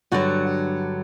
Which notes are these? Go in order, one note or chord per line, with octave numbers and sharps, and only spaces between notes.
G2 D3 F#3 F#4